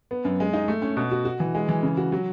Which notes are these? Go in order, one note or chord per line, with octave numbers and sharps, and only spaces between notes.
B3
F#2
G#3
D#4
A3
C#4
B2
F#4
F#4
E3
G#3
E3
C#3
F#4
F#3